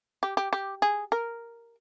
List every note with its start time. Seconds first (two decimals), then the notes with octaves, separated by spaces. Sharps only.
0.23 G4
0.37 G4
0.53 G4
0.82 G#4
1.12 A#4